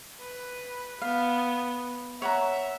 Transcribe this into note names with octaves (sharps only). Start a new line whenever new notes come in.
B4
B3 F5
C#5 E5 F#5 A#5